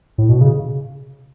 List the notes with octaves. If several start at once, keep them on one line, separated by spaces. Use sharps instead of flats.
A2
B2
C#3